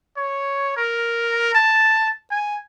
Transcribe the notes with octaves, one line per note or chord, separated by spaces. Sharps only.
C#5
A#4
A5
G#5